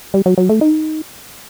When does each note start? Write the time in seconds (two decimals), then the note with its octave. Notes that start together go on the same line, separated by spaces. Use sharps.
0.14 G3
0.26 F#3
0.38 F#3
0.49 A3
0.61 D#4